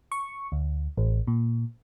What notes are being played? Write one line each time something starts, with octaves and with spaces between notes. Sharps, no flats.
C#6
D2
A1
A#2